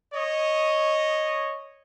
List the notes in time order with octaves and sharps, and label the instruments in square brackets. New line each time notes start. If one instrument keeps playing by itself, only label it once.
[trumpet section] C#5 D#5